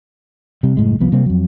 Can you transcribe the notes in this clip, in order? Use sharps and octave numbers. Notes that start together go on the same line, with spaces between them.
C3 G3
F#1 A2 G#3
C2 F3 B3
C3 G3 A#3 C4
F2 F#3